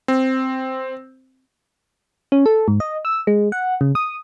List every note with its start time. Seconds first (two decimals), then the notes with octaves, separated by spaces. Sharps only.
0.08 C4
2.32 C#4
2.46 A4
2.68 G#2
2.80 D#5
3.05 E6
3.27 G#3
3.52 F#5
3.81 C#3
3.95 D#6